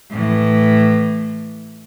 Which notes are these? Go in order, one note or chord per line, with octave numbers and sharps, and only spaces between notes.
A2 E3